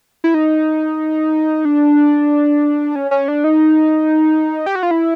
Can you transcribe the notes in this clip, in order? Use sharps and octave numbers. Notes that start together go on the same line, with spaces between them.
E4
D#4
D4
C#4
C#4
D4
D#4
G4
F#4
F4
E4